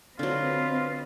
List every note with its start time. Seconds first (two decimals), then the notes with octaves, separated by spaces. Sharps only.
0.19 D3 F#3 C4 F4 B4 D#5